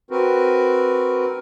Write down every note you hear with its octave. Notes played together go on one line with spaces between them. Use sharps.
C4 F#4 A#4 B4